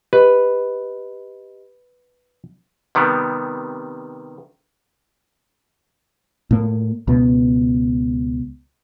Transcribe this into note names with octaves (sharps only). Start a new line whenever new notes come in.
G4 B4 D#5
C3 D#3 G3 B3
A2 A#3
C#2 B2